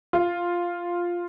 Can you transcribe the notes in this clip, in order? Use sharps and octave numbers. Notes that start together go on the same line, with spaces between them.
F4